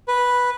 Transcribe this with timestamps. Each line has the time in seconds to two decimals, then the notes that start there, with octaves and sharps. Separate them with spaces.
0.08 B4